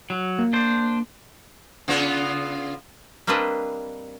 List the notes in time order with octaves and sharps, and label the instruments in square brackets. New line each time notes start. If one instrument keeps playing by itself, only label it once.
[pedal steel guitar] F#3
[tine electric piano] A#3
[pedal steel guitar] D4 C5
[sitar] C#3 B3 F4
[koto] G3 A#3 C4 D4 B4 D#5